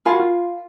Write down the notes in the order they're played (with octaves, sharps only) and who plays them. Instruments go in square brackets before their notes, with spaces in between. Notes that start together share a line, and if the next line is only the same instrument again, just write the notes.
[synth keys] F4 [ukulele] A#4 F5 G#5 B5
[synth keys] F#4
F4